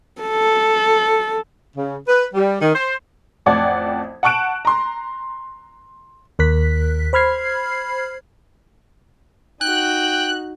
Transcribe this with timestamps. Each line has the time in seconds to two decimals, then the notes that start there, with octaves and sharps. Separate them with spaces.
0.21 A4
1.77 C#3
2.07 B4
2.34 G3
2.61 D#3
2.74 C5
3.46 A1 F2 D5 F#5 A5 G#6
4.23 F#5 A5 C#6 F#6 D7 E7
4.65 A#5 C6
6.39 D#2 A#4 F#6 B6
7.13 C5 B5 F6 G#6 C7
9.61 D#4 F#4 G5 F#6